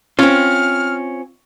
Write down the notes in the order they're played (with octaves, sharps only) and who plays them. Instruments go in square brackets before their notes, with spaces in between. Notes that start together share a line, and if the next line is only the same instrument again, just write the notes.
[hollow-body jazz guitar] C4 F4 [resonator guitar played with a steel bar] C#4 [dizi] F6